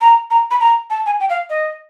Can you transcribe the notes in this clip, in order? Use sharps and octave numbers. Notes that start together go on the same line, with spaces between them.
A#5
A#5
B5
A#5
A5
G#5
G5
F5
D#5